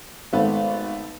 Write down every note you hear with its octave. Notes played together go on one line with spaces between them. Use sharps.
G#1 A3 B3